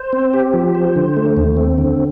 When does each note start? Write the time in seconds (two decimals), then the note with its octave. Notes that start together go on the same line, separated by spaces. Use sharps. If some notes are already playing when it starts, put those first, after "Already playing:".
Already playing: C5
0.13 C4
0.34 G4
0.54 F3
0.75 C5
0.96 D3
1.17 A3
1.37 D#2
1.57 C4
1.78 D3